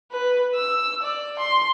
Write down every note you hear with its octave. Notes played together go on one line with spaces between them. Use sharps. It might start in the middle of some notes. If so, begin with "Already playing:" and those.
B4
E6
D5
C6